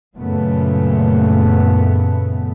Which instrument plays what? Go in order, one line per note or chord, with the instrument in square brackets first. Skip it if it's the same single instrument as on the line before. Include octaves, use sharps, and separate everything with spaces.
[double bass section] F#2 A#2 C#3 A3 B3